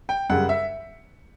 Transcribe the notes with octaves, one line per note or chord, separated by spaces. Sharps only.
G5
F#2 C#3 G3 F#5
E5